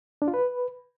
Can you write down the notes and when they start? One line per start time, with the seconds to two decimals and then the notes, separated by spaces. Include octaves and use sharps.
0.22 D4
0.28 F4
0.34 B4